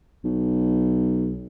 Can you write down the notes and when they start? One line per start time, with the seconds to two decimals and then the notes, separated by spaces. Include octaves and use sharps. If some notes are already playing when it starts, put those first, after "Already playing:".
0.24 B1